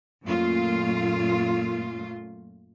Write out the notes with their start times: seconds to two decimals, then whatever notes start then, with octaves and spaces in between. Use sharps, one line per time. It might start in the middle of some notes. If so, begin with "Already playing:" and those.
0.23 F#2 A#2 A3 F4